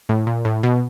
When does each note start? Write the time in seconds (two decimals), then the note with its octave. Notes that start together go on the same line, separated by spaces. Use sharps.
0.09 A2
0.27 A#2
0.45 A2
0.63 B2